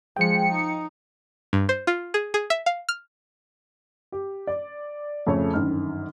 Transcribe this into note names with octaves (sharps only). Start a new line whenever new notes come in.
F3 G#3 G5 C#7
D#4
G2
C5
F4
G#4
G#4
E5
F5
F6
G4
D5
F2 C#3 A3 C#5
G1 F#2 D#3 F6